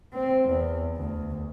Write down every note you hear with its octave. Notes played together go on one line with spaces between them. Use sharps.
C4
E2
D2